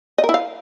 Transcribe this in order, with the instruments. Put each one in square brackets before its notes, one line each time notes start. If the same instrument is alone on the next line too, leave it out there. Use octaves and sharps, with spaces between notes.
[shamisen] D#5
A#4
E4
F5